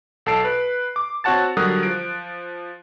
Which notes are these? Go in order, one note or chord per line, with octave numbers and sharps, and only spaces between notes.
B1 A4 A5 C7 D7
B4
D6
C4 F#4 C#5 F#5 A5 A6
D3 F#3 G3 A#4 D#6 F#6
F3 D7